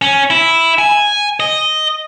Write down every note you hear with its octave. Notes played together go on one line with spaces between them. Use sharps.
C#4
E4
G#5
D#5